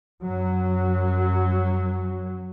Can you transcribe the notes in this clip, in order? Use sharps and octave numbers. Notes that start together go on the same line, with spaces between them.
F#2 F#3